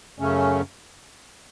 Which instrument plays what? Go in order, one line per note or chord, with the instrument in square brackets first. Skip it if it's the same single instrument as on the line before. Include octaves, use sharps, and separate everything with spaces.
[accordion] F#2 C#3 A3 C#4